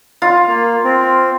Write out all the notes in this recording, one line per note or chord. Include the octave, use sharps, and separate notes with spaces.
F4
A#3
C4